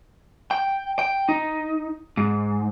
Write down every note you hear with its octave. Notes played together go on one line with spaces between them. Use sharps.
G5
G5
D#4
G#2